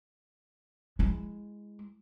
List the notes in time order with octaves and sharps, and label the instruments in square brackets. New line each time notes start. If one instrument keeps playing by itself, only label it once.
[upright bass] G#3 E4